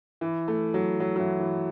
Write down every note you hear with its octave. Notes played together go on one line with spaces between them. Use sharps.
E3
A3
F#3
F#3
F#3
E3
E3